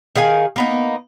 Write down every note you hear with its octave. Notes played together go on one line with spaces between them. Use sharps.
D#3 G#4 F5 G#5
A#3 B3 D#4